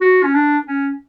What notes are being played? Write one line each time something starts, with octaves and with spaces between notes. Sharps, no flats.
F#4
C#4
D4
C#4